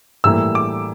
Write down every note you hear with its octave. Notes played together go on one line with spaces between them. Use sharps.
A2 E3 G3 A#3 E6
D6